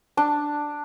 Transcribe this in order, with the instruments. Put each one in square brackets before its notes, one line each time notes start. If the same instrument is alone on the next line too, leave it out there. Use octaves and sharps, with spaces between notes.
[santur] D4